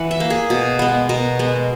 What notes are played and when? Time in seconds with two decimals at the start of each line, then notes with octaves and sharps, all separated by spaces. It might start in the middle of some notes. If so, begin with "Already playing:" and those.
Already playing: E3 F#5
0.11 E5
0.20 A#3
0.30 G#4
0.50 B2
0.79 G#3 B3
1.09 B2 A#4
1.39 G#3 B3